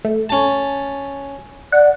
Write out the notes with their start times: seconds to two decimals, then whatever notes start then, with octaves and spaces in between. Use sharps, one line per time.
0.05 A3
0.29 C#4 A5
1.72 D5 F#5